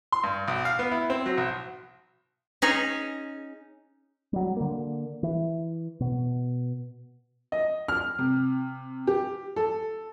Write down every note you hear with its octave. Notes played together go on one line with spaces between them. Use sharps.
C6
G2
B1
F5
B3
E4
C4
F#3
B1
C#4 D#4 G#4
F#3 G3
D3 A#3
E3
B2
D#5
F6
C3
G4
A4